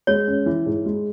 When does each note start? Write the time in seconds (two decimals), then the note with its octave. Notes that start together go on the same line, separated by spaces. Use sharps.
0.07 G#3 C#5
0.27 C#4
0.46 E3
0.66 G#2
0.86 G#3